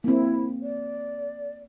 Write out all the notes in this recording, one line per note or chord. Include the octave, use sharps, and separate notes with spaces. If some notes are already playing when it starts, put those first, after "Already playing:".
A#3 C4 E4
D5